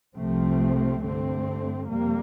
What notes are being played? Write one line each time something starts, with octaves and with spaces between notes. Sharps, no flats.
C2 C3 F3 A3 C4
G2 D3 A3 C4
F2 C3 G3 A#3